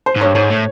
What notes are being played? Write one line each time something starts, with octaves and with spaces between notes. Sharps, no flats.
C5
G#2
C#5
G2
G#2 C#5
A2